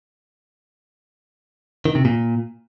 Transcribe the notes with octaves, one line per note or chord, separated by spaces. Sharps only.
D#3
C3
A#2